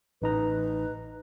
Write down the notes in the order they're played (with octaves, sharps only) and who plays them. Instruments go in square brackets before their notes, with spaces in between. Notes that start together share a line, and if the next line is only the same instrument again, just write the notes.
[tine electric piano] A1 D#4 A#5 [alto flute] B4